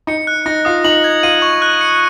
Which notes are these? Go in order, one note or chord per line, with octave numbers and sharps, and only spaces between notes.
D#4 C#7
F#6
D#4 A#6
F4 D#6
D#4 F#7
G#6
F4 D#7
C#6
F#6
C#7